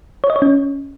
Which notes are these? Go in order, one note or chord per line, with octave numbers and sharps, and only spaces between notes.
C#5
D#5
C#5
C#4